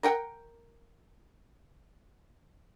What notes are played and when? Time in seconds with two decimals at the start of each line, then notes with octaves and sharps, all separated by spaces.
0.03 A#4 F#5 G5